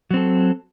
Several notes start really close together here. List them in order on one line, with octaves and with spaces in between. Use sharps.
F#3 C4 A4